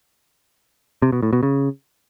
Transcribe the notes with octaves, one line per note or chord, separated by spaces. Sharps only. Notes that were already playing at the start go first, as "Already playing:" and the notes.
C3
B2
A2
B2
C#3